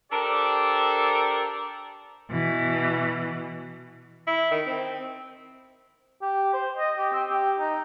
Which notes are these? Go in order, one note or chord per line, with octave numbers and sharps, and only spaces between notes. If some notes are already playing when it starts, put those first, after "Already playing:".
D4 G4 A4 A#4 C5 D5
B2 E3
E4
D#3
C4
G4
C5
D#5
G4
C4
G4
D#4